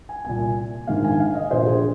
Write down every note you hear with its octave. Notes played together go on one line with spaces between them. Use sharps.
G#5
C2 A#2 G#5
A#1 G#2 D#3 F5
G#5
F5
D#5
A#1 A#2 C5
G#4